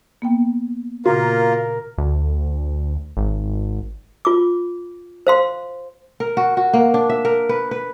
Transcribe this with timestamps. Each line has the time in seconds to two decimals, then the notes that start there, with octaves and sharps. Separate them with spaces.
0.22 A#3 B3 G5
1.06 A#2 C#3 A#3 F4 F#4 A#4
1.98 D2
3.17 G#1
4.25 F4 D6
5.27 C5 F5 C6
6.20 A#4
6.37 F#4
6.57 F#4
6.73 A#3
6.94 D4
7.10 E5
7.25 A#4
7.49 B4
7.71 B4